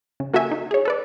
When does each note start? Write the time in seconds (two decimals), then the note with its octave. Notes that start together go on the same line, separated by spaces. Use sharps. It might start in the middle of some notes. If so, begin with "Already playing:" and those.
0.20 C#3
0.34 A#3 F#4 A4 E5 G#5
0.51 D#4
0.71 G#4 C#5
0.85 A4 B4 D5